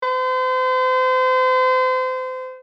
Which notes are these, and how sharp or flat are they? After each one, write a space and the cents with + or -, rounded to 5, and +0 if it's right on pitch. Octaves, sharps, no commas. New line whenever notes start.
C5 -35